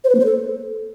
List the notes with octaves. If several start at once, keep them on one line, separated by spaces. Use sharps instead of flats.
C5
B4
A#3
C5
A4